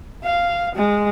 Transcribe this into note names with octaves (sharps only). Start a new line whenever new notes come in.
F5
G#3